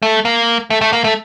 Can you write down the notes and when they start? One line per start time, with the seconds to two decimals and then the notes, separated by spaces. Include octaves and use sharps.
0.02 A3
0.25 A#3
0.70 A3
0.81 A3
0.93 A#3
1.04 A3